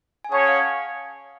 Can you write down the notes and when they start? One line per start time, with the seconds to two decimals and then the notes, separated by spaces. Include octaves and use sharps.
0.24 G#5
0.32 C#4 G#4 C#5 F#5 A5
0.47 F5 G#5